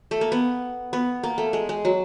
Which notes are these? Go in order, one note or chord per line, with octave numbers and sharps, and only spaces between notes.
A3
A#3
B3
B3
A#3
A3
G#3
G#3
F#3